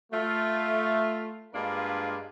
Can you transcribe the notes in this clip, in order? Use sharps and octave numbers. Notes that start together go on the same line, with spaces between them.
A3 F4
G2 G#3 A#3 D4 F4 B4